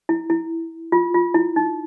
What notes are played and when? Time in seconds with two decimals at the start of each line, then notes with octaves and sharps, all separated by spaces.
0.09 E4
0.30 E4
0.92 F4
1.14 F4
1.34 E4
1.56 D#4